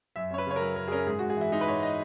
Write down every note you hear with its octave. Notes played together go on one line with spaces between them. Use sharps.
F#2 E5
C#4 C#5
B4
C#3 C#5
A#4
F#3 B4
F#2 A#4
G#4
C#4 A#4
G#2 G#4
G#2 F#4
G#4
E3 E4
G#3 D#4
B4
G#2 C#5
D#5